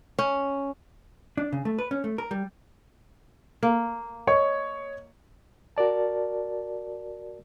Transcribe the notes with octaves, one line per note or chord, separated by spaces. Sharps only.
C#4
D4
C#3
A3
B4
C#4
A3
A#4
G3
A#3
C#5 D#5 C#6
F#4 A#4 D5 A5